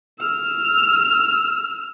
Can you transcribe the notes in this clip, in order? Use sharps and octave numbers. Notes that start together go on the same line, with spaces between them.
E6 F6